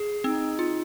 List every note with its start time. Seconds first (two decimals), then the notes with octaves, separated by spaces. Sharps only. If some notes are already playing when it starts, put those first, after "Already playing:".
Already playing: G#4
0.24 C4 D#4
0.59 F4